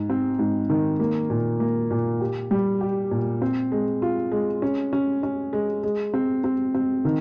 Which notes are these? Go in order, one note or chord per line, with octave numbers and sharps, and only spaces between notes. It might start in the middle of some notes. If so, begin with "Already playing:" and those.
Already playing: G#2
C4
G#2
D#3
A#3
A#2
A#3
A#2
G4
G3
G4
A#2
C4
G#3
F4
G#3
C#4
C#4
C#4
G#3
G#3
C4
C4
C4
D#3